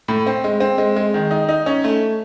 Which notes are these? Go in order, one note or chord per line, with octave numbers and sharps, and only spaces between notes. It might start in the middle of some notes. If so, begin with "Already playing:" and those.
A2
C4
G#3
C4
G#3
G#3
D#3
D#4
D#4
C#4
A3